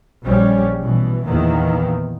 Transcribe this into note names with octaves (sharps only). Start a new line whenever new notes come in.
A#1 G3 C#4
B2 E3
A#1 E2 D#3 E3 A#3 B3